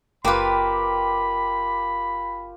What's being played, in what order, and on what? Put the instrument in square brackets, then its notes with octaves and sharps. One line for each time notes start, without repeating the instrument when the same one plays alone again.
[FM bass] F#1 [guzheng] A#3 B4 [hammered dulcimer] F4 G4 [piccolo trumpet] B5